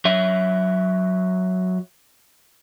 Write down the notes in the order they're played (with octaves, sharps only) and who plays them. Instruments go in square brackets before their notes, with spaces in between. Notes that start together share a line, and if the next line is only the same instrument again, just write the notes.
[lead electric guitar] F#3 E5